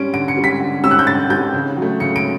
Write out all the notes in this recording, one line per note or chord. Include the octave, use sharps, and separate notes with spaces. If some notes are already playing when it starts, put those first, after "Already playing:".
Already playing: G3 C#4 D7
D3 D7
C#7
G3 C#4
B6
D3
G3 C#4 E6
F#6
G6
D3 A6
G3 C#4 G6
C#3
F#3
A3
C#3 C#7
D7